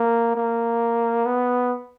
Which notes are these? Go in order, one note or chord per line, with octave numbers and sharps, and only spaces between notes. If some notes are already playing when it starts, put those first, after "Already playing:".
Already playing: A#3
A#3
B3